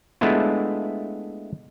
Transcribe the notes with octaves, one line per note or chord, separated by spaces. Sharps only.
G#3 A3 B3 D4 E4 F4